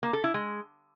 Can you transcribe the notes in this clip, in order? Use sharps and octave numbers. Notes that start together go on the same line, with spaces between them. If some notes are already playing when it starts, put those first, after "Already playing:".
A#3
A4
E4
G#3